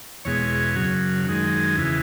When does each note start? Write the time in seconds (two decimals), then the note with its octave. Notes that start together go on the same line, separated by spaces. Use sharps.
0.25 E2 B2 G#3 C#5
0.76 F#2 C#3 F#3
1.25 F#2 D#3 G#3
1.76 E2 C#3 E3